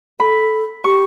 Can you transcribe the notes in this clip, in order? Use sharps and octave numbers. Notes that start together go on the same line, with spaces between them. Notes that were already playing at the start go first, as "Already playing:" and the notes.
A4 B5
G4 C#6